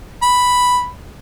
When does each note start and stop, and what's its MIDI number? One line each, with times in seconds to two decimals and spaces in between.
0.23 0.87 83